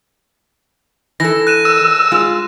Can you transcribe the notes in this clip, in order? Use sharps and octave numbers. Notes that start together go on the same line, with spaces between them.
E3 A4 A#6
F#6 D#7 E7
E6 F#6
G#3 F4